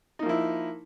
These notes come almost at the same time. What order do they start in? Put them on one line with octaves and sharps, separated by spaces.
D#4 A#3 F3 E4